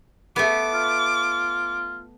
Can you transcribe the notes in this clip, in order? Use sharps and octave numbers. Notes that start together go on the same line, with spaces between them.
A3 B3 D6
F4